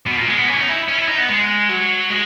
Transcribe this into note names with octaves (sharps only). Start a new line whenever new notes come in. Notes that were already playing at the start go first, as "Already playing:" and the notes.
B2
A#2
G#3
B3
C#4
E4
D#4
E4
C#4
E4
D#4
B3
G#3
F#3
G#3